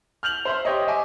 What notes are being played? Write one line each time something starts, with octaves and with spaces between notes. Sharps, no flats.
F6 G6 F7 F#7
C5 E5 C6
G4 C5 C#5 D#5
D#5 E5 G#5 D6